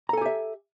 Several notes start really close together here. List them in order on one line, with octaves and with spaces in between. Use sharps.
A#5 A4 G#5 G4 E5